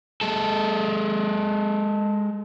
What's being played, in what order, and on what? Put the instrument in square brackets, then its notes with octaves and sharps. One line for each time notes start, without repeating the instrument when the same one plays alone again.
[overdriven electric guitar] G#3 A4